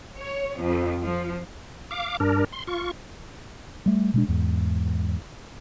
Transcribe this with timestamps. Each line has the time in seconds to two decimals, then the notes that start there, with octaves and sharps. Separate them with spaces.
0.17 C#5
0.59 F2
1.02 F3
1.91 F5 D6
2.20 G2 D4 A#4
2.52 C6
2.67 F4 C#6
3.86 G3 A3
4.14 B2 G#3 D4
4.28 E2 G#2